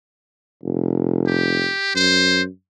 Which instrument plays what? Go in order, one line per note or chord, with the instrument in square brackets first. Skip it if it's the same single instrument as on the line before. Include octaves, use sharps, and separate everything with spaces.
[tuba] F1
[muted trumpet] G4
[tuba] F#2 [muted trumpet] C5